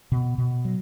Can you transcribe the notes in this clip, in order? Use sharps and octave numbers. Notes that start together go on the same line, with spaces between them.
B2
B2
F#3